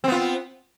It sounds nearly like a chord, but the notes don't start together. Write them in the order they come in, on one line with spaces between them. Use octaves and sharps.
C4 B3 F4